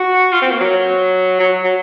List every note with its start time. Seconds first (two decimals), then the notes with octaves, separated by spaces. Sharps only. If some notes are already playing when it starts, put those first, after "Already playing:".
Already playing: F#4
0.33 F4
0.41 C4
0.51 A#3
0.60 F#3
1.40 F#3
1.64 F#3